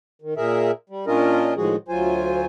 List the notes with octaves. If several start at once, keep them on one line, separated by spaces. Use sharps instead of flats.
D#3
A#2 G#4 A#4 E5
G3
A#2 C#4 D4 F4 A#4 D#5
A2 D#3 F3 G#3 F#4 G#4
D2 F#3 F4 C5 G#5